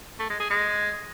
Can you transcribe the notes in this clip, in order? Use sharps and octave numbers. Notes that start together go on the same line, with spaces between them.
A3
G#3
G#4
G#3